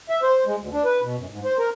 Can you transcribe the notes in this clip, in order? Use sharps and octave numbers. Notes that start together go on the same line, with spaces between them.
E5
C5
G#3
D2
D4
B4
B2
F#2
G#2
C5
A#4